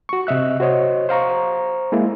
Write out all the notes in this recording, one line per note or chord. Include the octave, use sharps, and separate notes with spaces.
F#4 C#6
C3 D#5 E5 F#6
F#4 C5 C#5 D#5
C5 F5 A#5 C#6
G#3 A#3 E4